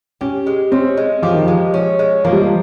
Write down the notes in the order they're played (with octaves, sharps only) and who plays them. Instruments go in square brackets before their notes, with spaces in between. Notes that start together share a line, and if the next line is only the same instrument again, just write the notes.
[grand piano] C#4 [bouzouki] G4
[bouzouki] G#3
[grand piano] C4 [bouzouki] C#4
[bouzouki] G#3
[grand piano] F3 [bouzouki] G4
[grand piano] D#3
[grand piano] F3 [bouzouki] G#3
[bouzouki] C#4
G#3
[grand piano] F3 [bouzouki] A#3
[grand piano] G3
F3